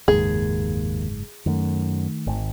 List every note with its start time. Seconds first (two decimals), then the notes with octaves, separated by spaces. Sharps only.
0.08 F#1 D#2 G#2 G#4
1.46 F#2 D#3 A3
2.27 G#1